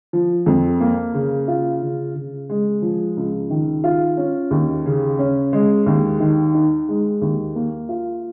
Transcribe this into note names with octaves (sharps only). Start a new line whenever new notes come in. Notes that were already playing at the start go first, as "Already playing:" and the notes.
F3
F2
A#3
C#3
F4
C#3
C#3
G#3
F3
C#2
D#3
F4
C#4
D#2
C#3
C#4
G#3
D#2
D#3
D#4
G#3
D#2
A#3
F4